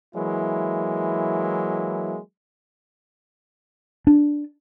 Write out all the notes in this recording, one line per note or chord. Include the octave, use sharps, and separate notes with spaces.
E3 F#3 G#3 A#3 E4
D4